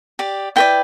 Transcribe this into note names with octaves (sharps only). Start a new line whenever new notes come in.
G4 D5
E4 B4 D5 G5